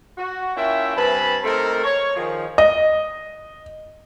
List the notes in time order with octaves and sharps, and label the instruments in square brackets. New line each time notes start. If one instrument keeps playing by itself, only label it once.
[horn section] F#4
A#3 C#4 E4 F4 E5 G5
G2 C4 B4 G#5 A5 B5
A3 A#3 C4 D#4 A4 A#4
C#5
D#3 F3 G#4
[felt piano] D#5